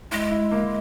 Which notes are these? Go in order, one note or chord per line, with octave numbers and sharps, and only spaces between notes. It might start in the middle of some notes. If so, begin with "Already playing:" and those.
G#3 E4
E4
A#3